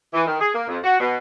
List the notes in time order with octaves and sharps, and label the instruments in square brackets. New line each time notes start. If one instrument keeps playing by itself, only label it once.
[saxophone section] E3
D#3
G#4
A#3
F2
F#4
B2